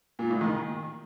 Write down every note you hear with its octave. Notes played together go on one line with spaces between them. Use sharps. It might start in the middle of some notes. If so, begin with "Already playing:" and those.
A#2
A2
D#3